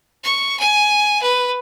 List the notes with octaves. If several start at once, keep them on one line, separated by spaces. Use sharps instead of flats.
C#6
G#5
B4